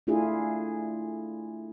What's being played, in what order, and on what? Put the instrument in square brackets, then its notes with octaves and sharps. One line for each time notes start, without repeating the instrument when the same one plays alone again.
[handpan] A3 D4 E4 F4 G#4